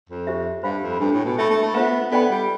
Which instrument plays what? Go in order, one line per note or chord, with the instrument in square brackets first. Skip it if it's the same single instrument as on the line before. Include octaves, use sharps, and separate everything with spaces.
[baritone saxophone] F2
[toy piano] G4 C5 E5
[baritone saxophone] G2 [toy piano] C5 F5 B5
[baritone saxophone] F2
[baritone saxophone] G2 [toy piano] D4 A4 C5
[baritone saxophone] A2
B2
[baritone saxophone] A3 [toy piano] A4 E5 B5
[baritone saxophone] A3
A3
[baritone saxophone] B3 [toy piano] F4 C5 E5
[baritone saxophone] B3 [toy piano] A4 D5 G5 B5
[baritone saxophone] G3